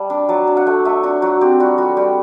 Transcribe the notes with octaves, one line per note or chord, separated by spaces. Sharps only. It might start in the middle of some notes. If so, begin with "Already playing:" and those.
Already playing: G3 A5
D4
F#3 A5
D4
F#5
A3
A3 E5
D4 F#4
F#3 F#4
C4 G4
G3 F#4
G3 F#4
G3 G4